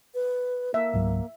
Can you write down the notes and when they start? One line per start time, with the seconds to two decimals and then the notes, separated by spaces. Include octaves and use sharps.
0.14 B4
0.74 A#3 E5
0.94 C#2 G#2 F#3